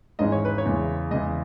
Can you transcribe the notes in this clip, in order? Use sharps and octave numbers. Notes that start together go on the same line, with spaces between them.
G#1 G#2 E3 G#3 C#4 D#5
C#5
B4
C#5
E2 C#3 E3 G#3
E2 C#3 E3 G#3 D#5